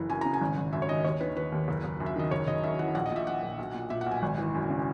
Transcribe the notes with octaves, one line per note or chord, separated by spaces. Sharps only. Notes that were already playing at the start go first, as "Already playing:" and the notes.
Already playing: F#1 E3
F#2 G#5
C#3 A#5
G#5
G#1
G#1
F#2 E5
C#5
D#3 D#5
D#2 C#5
D#3 B4
D#3 B4
D#2
F#1
F#1
F#2
E5
D#3 D#5
F#1 C#5
F#1 D#5
F#2 E5
E3 F#5
A#1 F#5
D#5
A#2 E5
A#2 F#5
A#1
B1
A#2
A#2 E5
F#5
B1
G#5
G#1
E3
F#2
C#3